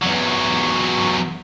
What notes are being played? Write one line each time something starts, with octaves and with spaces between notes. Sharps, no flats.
E2 F#3